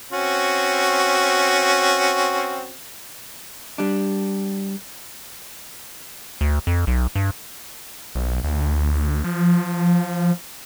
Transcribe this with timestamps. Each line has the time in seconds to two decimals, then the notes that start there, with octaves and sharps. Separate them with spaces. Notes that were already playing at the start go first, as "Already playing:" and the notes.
0.12 C4 C#4 F#4
3.78 G3 D4
6.41 D2
6.67 F2
6.87 B1
7.15 G2
8.15 B1
8.44 D2
9.24 F3